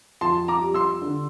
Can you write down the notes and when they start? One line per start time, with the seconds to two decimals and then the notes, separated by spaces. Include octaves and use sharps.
0.21 F2 A5 C6
0.48 A#5 D6
0.61 G3
0.74 C6 E6
1.02 D3